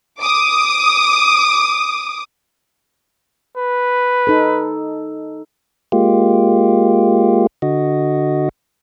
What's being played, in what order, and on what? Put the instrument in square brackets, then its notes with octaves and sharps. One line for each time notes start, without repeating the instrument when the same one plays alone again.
[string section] D6 D#6
[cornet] B4
[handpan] D#4 A4
[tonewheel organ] G#3 A#3 F4 G4
D3 F#4 D#5